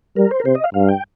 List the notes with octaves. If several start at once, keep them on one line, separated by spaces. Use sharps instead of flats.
G3 A#4
C5
A#4
C3 C5
D#5
F5
G2 F5
G5